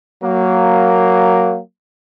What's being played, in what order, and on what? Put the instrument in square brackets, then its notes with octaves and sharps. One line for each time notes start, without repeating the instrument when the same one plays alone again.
[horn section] F#3 A#3